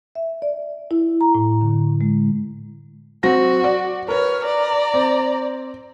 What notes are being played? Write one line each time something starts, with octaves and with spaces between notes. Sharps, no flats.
E5
D5
E4
A#5
A2
D3
G#3
F#3 C4 F#4 A#6
D5
A#4 B4 C#5 F6
D5 A#5
C4